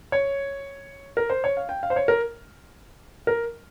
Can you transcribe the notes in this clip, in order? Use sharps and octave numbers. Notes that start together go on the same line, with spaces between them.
C#5
A#4
C5
C#5
F5
G5
F5
C5
C#5
A#4
A#4